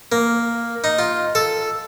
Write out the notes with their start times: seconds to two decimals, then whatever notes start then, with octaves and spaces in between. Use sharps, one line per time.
0.12 A#3
0.84 D#4
0.99 F4
1.35 A4